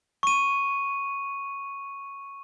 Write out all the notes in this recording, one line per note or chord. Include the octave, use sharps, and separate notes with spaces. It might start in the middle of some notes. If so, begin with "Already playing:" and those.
C#6 D#7